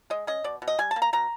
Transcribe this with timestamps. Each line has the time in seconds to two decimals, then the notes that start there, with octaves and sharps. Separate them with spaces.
0.10 G#3 D#5
0.27 C#4 D#5
0.44 B2 D5
0.62 B2
0.68 D#5
0.79 G3 G#5
0.91 A5
0.96 A#3
1.02 A#5
1.13 B2 A#5